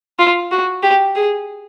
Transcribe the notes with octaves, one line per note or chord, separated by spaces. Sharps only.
F4
F#4
G4
G#4